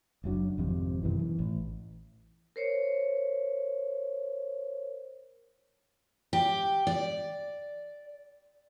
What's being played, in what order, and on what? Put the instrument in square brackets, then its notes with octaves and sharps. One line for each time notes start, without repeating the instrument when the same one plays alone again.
[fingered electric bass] F#1 F#2 F#3 D4
G#1 F2 C3
F#2 B2 D#3 E3
E3
A1
[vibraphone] A#4 C5 C#5
[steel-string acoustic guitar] G4
D5